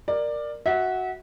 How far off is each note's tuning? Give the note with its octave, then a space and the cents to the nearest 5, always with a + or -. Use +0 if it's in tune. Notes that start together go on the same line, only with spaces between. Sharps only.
A#4 +0 D5 +15
F#4 +0 E5 -30